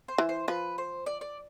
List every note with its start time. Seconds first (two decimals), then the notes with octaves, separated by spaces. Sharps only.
0.08 C5
0.18 E3
0.29 C5
0.48 F3 B4
0.78 C5
1.06 D5
1.21 D5